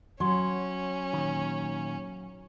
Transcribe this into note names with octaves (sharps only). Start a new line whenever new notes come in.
F#3 C#4 C6
A#2 D#3